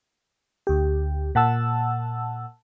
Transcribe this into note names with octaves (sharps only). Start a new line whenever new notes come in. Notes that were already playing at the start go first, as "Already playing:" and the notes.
D2 G4
A#2 F#5 A5 E6